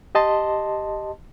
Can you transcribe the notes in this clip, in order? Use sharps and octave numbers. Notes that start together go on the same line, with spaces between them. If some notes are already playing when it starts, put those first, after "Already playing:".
G4 D#5 A5 C6